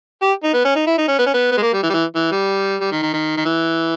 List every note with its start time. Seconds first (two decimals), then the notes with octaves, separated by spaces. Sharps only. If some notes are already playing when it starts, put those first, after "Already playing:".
0.22 G4
0.44 D#4
0.54 B3
0.65 C#4
0.75 D#4
0.87 E4
0.98 D#4
1.08 C#4
1.19 B3
1.26 C#4
1.34 B3
1.51 B3
1.57 G#3
1.62 A#3
1.73 G3
1.83 E3
1.90 G3
1.93 E3
2.15 E3
2.32 G3
2.80 G3
2.92 D#3
3.02 D#3
3.13 D#3
3.37 D#3
3.45 E3